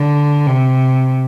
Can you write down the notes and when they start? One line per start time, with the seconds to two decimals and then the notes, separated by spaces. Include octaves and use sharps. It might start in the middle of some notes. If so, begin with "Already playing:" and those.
Already playing: D3
0.47 C3